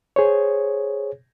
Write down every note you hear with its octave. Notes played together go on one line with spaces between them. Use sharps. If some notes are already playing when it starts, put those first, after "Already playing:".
G#4 C5 C#5